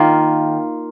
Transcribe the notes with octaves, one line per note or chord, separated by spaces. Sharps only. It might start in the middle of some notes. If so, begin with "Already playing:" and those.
Already playing: D#3 A#3 F4